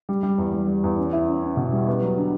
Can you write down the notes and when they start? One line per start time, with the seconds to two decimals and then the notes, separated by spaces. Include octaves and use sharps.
0.09 G3
0.23 G3
0.38 E2
0.53 G3
0.68 G3
0.84 E2
0.98 C#4
1.13 E4
1.28 C#4
1.43 C#4
1.57 B2
1.72 G3
1.87 B3
2.02 F#3
2.17 D3